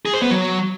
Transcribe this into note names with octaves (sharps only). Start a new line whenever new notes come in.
G#4
C5
B3
F#3